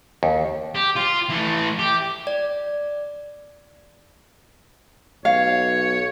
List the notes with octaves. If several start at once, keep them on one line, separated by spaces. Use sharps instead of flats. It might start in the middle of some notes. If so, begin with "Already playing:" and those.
D#2
G4
F4
E3 A3
G4
D5
B1 C#5 F5